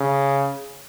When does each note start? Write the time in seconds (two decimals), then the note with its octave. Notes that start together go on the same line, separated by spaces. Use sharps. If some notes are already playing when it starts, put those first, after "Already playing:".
Already playing: C#3